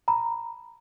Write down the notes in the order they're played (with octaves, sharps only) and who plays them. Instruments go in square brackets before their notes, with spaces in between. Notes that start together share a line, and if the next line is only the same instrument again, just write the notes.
[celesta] A#5 B5